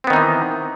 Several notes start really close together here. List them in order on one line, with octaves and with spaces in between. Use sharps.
C4 B3 D#3 D#4 E3